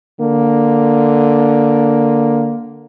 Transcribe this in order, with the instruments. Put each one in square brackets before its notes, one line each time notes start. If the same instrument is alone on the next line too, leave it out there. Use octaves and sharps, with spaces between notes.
[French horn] D3 [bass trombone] A#3